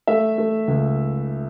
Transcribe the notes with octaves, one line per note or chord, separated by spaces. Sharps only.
A3 E5
A3
C#2